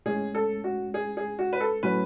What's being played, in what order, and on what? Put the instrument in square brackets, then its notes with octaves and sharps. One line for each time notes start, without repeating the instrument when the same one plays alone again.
[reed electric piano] A2 G#3 C#4 [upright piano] G#4
[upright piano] A4
F#4
G#4
G#4
F#4
B4
A4
[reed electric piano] A2 F#3 C#4 [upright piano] B4